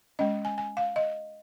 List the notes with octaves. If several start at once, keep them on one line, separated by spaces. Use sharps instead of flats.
G#3 C#4 D#5
G#5
G#5
F5
D#5